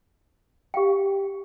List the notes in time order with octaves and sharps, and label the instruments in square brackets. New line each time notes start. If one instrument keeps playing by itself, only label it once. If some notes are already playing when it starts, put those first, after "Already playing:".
[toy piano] G4 F5 G5